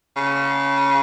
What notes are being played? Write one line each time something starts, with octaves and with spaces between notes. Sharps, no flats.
C#3